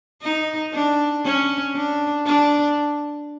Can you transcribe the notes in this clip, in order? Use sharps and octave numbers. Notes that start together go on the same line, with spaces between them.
D#4
D4
C#4
D4
D4